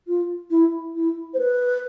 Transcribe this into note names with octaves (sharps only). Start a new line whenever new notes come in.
F4
E4
E4
C5
B4